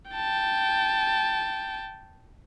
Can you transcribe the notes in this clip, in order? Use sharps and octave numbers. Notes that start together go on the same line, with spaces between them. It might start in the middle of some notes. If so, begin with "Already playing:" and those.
G5 A5